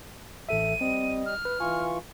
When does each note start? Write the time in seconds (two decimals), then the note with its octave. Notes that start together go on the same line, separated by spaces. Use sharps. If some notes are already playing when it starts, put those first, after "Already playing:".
0.49 A1 A4 E5 D#7
0.81 G3 C4 D#5
1.25 F6
1.45 B4
1.60 E3 F4 G#5 C#6